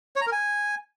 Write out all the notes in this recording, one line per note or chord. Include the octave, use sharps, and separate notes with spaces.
C#5
A#5
A#4
G#5